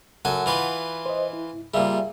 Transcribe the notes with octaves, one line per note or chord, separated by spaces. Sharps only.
F#2 A4 F#5 G#5
E3 F4 B4
C5 D#5
E4
A#2 G3 G#4 E5 F5